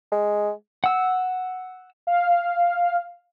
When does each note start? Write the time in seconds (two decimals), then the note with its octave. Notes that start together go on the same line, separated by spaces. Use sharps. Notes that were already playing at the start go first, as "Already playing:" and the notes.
0.12 G#3
0.84 F#5 E6
2.07 F5